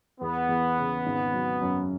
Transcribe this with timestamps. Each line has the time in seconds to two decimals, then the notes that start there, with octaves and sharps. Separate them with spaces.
0.20 E2 B3
0.49 E2
0.78 C#3
1.06 G#1
1.33 F#3
1.62 F#2